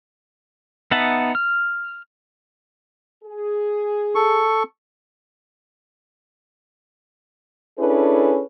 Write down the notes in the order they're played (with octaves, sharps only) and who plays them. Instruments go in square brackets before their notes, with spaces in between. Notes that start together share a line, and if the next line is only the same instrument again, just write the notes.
[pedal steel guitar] B3 D#4 E5 F#5 A5
F6
[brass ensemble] G#4
[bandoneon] A4 C#6
[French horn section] C#4 D4 E4 G#4 A4 B4